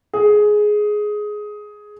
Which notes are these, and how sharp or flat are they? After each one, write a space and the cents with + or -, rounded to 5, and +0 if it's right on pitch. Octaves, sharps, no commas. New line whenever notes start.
G#4 +10